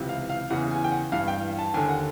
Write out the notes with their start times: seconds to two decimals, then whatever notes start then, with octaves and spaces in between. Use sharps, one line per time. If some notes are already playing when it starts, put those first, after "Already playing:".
Already playing: C#2 C3 E3
0.09 F5
0.30 F5
0.50 E2 C#3 E3 F#5
0.71 G#5
0.84 G5
0.92 F#5
1.12 G2 E3 F5
1.28 G5
1.59 A5
1.74 D#2 D3 G#5
1.89 F#5